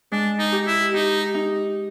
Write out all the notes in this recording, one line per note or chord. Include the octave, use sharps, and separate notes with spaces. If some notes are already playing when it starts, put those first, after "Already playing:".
G#3 D4
D#4
G4
E4
D#4 G4
D#4